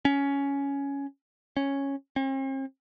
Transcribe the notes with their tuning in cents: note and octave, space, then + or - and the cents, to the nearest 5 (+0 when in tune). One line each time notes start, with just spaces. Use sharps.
C#4 +10
C#4 -5
C4 +45